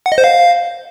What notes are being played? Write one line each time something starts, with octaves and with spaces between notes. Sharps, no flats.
F#5
D#5
C5
F5